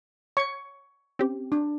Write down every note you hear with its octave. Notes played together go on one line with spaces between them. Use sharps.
C#5 C#6 G#6
C4 C#4 G4
D4